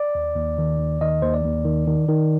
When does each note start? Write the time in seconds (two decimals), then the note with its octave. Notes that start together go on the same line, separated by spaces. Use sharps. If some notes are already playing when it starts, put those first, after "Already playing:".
Already playing: D5
0.15 D#2
0.36 D#2
0.58 D#3
0.79 D#2
1.01 D#3 D#5
1.22 D#2 C5
1.34 D5
1.44 D#2
1.65 D#3
1.88 D#3
2.08 D#3